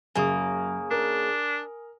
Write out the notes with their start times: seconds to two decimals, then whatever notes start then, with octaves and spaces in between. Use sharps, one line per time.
0.15 F#2 C#3 A#3 G#5 D#6
0.91 D4 A#4